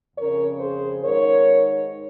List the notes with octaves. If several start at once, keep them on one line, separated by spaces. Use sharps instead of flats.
F2 C#3 A#4 C#5
G#4 C5
G#2 D#3 A#4 C#5